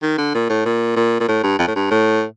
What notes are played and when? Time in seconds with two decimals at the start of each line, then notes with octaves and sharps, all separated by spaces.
0.02 D#3
0.18 D3
0.34 A#2
0.49 A2
0.65 A#2
0.96 A#2
1.20 A#2
1.28 A2
1.43 G2
1.59 F2
1.67 A2
1.75 G2
1.91 A2